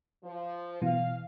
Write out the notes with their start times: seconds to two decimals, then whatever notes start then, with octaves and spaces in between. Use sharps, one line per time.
0.24 F3
0.82 B2 E3 F5